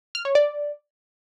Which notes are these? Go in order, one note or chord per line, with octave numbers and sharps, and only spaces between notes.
F6
C#5
D5